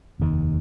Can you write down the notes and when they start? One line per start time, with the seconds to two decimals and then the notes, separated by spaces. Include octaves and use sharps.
0.19 F1 D#2 D#3